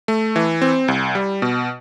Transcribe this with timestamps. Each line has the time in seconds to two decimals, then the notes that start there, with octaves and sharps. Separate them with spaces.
0.08 A3
0.36 E3
0.62 C4
0.88 C2
1.15 G3
1.42 B2